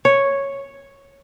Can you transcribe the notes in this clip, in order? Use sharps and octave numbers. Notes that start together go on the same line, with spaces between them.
C#5